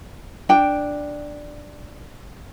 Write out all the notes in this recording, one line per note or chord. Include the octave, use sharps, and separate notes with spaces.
D4 G5